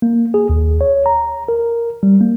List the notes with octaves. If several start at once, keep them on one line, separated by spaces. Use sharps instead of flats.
A#3
G#4
D#2
C#5
A#5
A#4
G3
A#3